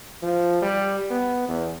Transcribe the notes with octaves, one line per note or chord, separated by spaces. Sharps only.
F3
G3
B3
E2